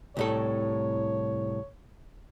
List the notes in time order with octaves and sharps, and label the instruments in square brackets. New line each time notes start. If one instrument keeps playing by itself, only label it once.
[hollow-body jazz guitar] C2 A2 A4 [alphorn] C#5